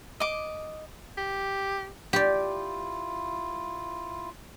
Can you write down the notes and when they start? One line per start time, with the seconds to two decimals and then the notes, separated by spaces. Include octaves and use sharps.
0.20 D#5 D6
1.17 G4
2.13 E4 F4 G4 D5